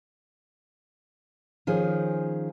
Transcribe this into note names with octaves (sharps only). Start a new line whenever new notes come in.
D#3 F3 C#4 G#4